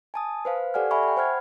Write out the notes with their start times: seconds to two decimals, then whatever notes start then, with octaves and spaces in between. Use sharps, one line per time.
0.14 G#5 A5 D#6
0.45 B4 C5 F5
0.74 G4 A4 D5 F#5 G#5 F6
0.91 E5 G#5 B5 C#6
1.03 G5 B5
1.17 C5 F#5 F6 G#6